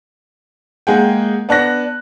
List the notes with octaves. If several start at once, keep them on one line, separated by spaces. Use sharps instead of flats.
G#3 A#3 G#4 F#5 G5
B3 D4 F#6 A#6